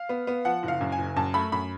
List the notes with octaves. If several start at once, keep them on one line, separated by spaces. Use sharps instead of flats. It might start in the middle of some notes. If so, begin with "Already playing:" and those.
Already playing: F5
B3
B3
F3 F#5
F#1
F5
F#2
G#5
F#1
F#2 A5
A3 B5
F#2 B5